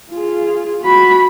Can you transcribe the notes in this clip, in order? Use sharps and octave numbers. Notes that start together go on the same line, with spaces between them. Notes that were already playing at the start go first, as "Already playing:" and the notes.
F4 G#4
F#4 B5